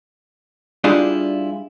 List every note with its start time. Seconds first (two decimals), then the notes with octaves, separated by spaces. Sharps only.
0.84 G3 D4 E4 F4 G4 G#4